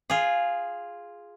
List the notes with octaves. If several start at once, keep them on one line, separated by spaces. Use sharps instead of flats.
F4 G#4